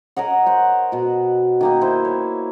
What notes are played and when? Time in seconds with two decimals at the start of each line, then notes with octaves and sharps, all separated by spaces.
0.16 A#4 C#5 D#5 F#5
0.46 C5 F#5
0.92 B2 F#4
1.61 D#3 A#3 D#4
1.81 E4 C5 D#5
2.05 C#5